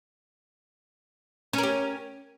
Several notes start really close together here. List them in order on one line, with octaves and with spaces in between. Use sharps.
C#4 A#4 G4